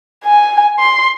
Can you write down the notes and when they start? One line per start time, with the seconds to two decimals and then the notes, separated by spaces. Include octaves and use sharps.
0.24 G#5
0.79 C6